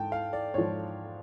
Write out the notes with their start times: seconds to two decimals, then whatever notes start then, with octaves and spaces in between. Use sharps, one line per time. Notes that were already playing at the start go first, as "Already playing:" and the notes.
Already playing: G#2 G5 A5
0.12 F5
0.33 D5
0.54 G#2 F3 C#5